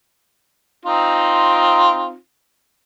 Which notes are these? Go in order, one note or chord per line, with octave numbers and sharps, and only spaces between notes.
C4 D#4 F4